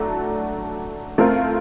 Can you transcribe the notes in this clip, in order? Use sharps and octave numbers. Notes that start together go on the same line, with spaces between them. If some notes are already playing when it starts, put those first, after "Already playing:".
Already playing: F#3 A3 D4 F#4 A4
A3 C4 F4 A#4